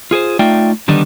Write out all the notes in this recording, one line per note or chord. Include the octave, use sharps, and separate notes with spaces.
F4 G#4 A#4 C5
A3 D#4 F4 D5 E5 G5
D3 D#3 G3 B3 D4 D#4